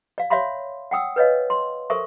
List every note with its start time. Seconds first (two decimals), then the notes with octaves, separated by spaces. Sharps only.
0.18 D5 F5
0.30 C#5 D5 E5 F5 B5 C6
0.91 F#5 G5 D#6 E6
1.16 B4 C#5 D#5 F5
1.50 C6
1.90 A4 A#4 C5 E5 C#6